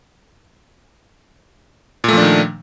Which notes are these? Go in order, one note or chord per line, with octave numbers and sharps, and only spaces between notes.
A#2 D#3 F3 A3 D4